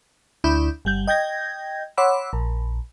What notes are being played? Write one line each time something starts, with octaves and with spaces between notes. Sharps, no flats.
D2 D4 E4 B5 G6
G1 G3 G6
D#5 G5 G6 G#6 A#6
C#5 F#5 B5 C6 D6 E6
A#1